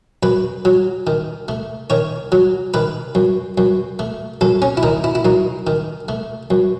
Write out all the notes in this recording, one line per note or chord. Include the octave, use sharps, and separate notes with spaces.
F#2 B4
F#3
D#3
A3
D#3 C#5
F#3
D#3 B4
F#2
F#2
A3
F#2 A4
C#4
E4
D#3 D#4
E4
E4
F#2 D#4
D#3
A3
F#2